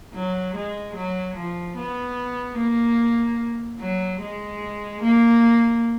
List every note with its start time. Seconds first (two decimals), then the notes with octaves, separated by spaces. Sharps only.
0.14 F#3
0.55 G#3
0.95 F#3
1.36 F3
1.77 B3
2.58 A#3
3.80 F#3
4.20 G#3
5.02 A#3